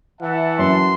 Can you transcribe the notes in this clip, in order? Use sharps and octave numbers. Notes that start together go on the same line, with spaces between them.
E3 E5 F#5 A5
F#2 C6